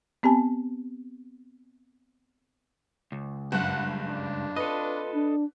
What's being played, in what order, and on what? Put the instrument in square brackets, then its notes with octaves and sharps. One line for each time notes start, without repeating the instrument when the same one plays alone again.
[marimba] B3 C4 G4 G#5 A5
[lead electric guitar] C#2
[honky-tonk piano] F#1 G2 F#6 [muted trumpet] F#5
[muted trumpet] D4
[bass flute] F4 [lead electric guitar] A4 D#5 [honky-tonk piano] B4
[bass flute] D4